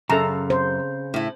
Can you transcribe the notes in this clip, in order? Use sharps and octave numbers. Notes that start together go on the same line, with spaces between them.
F#2 C#3 A4 A5 A#5
C5
A2 E4